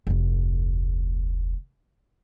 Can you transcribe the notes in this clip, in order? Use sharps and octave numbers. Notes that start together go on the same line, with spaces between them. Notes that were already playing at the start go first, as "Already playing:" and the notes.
F1 D2